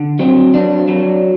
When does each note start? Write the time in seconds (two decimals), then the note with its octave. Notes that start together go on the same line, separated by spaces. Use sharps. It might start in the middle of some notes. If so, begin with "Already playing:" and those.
Already playing: D3
0.19 F#3 C4
0.54 F#3 D4
0.88 F#3